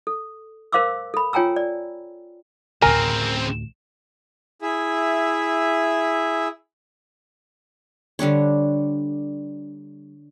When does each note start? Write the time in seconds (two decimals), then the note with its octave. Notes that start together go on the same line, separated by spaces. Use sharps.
0.07 A4
0.73 A#4 C5 F5 C6 D6 E6
1.14 A4 B5
1.33 F4 C#5 G5 G#5 A#5 E6
1.56 D5
2.82 A1 D2 C#3 C4 A#4 G#5
4.62 E4 G#4 E5
8.19 D3 G3 D4 C#5